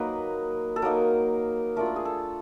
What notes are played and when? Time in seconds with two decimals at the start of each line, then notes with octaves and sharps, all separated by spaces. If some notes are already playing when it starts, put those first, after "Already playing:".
Already playing: F#3 A#3 D#4 B4
0.76 A4
0.82 F#3 A#3 D#4 A#4
1.76 A3 D4 F4 A#4
1.86 A4
1.96 G#4
2.05 A4